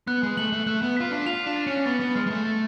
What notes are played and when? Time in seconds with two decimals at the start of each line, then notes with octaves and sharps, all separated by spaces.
0.07 B3 F#6
0.23 G#3
0.37 A3 F#7
0.52 A3
0.67 A3 F#6
0.82 B3
0.97 F4 B6
1.11 D4
1.26 F4 F7
1.46 D4
1.56 A6
1.67 C#4
1.86 B3 A6
2.00 B3
2.15 G#3 F6
2.26 G#3
2.30 A3
2.45 A6